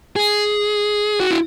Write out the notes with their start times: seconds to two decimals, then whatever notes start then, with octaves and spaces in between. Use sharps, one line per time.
0.16 G#4
1.20 F#4
1.31 E4